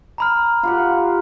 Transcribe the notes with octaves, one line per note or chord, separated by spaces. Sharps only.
A#5 B5 F6
F4 G4 F#5